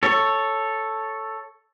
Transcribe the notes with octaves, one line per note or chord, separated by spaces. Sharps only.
A4 C#5